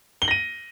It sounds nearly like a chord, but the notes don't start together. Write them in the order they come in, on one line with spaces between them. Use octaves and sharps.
G7 F#7 A#6 D#7